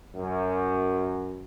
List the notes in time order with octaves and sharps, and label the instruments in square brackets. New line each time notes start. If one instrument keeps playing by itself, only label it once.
[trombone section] F#2